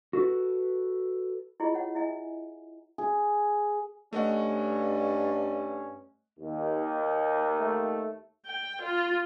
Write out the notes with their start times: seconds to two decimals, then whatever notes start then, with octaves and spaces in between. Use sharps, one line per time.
0.13 F#4 A4 B4
1.60 E4 F4 G4 G#4 D#5
1.74 C#5 F#5
1.95 E4 D#5 E5 G#5
2.98 G#4
4.13 G2 A3 C#4 D#5 F#5
6.39 D#2
7.59 A3
8.46 G5
8.82 F4